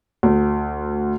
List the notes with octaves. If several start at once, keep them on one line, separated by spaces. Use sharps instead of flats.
D2